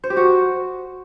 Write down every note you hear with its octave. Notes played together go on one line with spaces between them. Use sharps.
C5
G4
F#4